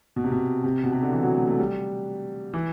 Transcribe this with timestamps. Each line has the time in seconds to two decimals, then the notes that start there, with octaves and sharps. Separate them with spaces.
0.16 B2
0.24 C3
0.31 B2
0.64 C3
0.84 B2
0.92 C3
1.03 D3
1.12 E3
1.23 F#3
1.35 A3
1.48 A3
1.59 G3
2.54 E3